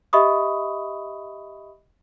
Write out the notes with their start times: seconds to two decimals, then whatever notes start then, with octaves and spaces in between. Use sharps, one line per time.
0.13 G4 D#5 E5 B5 C#6 D#6